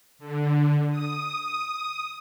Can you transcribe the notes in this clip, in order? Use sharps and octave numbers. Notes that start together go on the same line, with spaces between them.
D3
D#6